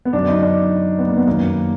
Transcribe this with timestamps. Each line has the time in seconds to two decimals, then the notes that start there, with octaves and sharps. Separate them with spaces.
0.05 B3
0.13 F#2 D3 F#3 D4
0.28 D#4
0.42 D4
0.99 B3
1.08 A#3
1.17 B3
1.27 F#2 D#3 F#3 A#3